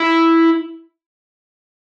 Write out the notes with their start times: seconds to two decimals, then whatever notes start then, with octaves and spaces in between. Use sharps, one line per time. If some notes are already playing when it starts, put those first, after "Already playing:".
Already playing: E4